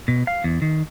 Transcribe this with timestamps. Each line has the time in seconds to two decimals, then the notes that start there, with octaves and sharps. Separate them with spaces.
0.08 B2
0.27 F5
0.44 E2
0.62 D#3